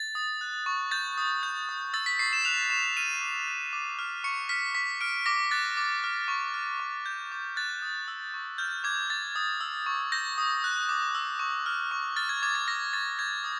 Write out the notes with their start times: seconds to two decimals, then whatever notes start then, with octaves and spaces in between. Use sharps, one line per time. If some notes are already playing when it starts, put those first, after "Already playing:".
Already playing: A6
0.15 D#6
0.41 F#6
0.66 C#6
0.91 G6 A6
1.18 D#6
1.43 G6
1.69 D#6
1.94 E6 A6
2.06 B6
2.19 C#6 C7
2.33 E7
2.45 F#6 F7
2.70 C#6 E7
2.97 F6 D#7
3.21 D6
3.48 F#6
3.73 D6
3.99 F6
4.24 C#6 C#7
4.49 F6 B6
4.75 C#6 B6
5.01 F6 D7
5.26 D6 A#6
5.51 F#6 A6
5.77 D6
6.04 F6
6.28 C#6
6.54 F6
6.80 C#6
7.06 G6
7.32 D6
7.56 F#6 A6
7.82 D#6
8.08 E6
8.34 C#6
8.58 F6 G6
8.84 D6 G#6
9.10 G6 A6
9.36 D#6
9.61 E6
9.86 C#6
10.12 G6 A#6
10.38 D#6
10.64 F#6
10.89 D6
11.15 E6
11.39 C#6
11.66 F6
11.91 C#6
12.16 F6 A6
12.29 G#6
12.43 D6 G#6
12.55 A6
12.67 F6 A#6
12.93 C#6 A6
13.19 G6 G#6
13.44 D#6